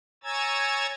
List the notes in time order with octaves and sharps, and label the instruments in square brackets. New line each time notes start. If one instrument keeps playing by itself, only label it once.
[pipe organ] C#5 G#5 A#5 E6 G#6 A6